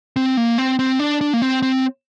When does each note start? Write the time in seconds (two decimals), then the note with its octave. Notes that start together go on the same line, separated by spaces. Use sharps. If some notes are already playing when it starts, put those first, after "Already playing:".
0.16 C4
0.37 A#3
0.58 C4
0.79 C4
0.99 D4
1.21 D4
1.33 A#3
1.42 C4
1.62 C4